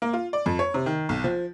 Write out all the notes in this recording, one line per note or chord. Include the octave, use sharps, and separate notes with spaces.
A#3
F4
D5
F2
C#5
C3
D#3
B1
F3